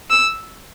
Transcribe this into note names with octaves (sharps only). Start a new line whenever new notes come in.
E6